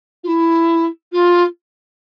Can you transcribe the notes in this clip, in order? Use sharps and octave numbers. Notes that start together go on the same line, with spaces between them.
F4
E4
F4